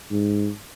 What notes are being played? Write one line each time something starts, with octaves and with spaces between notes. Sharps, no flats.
G#2